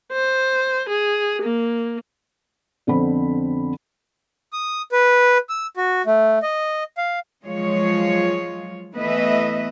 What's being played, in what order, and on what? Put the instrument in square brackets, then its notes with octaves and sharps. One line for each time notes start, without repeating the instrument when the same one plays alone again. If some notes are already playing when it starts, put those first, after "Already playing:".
[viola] C5
G#4
A#3
[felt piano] F2 D3 B3 C4 B5
[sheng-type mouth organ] D#6
B4
E6
F#4
A3
D#5
F5
[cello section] F3 F#3 G#3 F4 C#5
E3 A3 B3 B4 D#5 E5